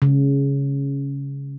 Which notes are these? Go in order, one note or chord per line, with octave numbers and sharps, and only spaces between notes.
C#3